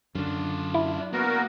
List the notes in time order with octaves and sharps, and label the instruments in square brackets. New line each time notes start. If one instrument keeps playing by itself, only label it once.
[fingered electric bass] F#2 D3 [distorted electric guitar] D4 F4
[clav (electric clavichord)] E4
[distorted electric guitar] A#3 [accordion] B3 F#4 A#4